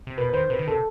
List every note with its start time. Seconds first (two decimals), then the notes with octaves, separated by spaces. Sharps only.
0.07 C3
0.17 B2 B4
0.29 B4
0.33 D#3 C5
0.50 C3 B4
0.59 D#3
0.67 C3 A4